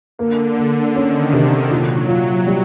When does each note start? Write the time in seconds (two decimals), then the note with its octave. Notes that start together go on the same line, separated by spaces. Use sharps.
0.18 D3 A#3
0.57 A#3
0.95 D#3 C#4
1.33 C3
1.71 A#2 F#3
2.08 F4
2.47 G3